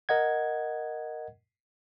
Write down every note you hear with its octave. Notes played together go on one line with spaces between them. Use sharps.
A#4 D#5 F#5 G#6